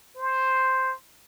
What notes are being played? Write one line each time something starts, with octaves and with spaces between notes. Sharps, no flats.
C5